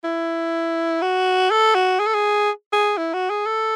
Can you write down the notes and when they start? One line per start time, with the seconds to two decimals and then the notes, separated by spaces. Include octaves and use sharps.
0.04 E4
1.02 F#4
1.51 A4
1.75 F#4
2.00 G#4
2.07 A4
2.14 G#4
2.73 G#4
2.97 E4
3.13 F#4
3.30 G#4
3.46 A4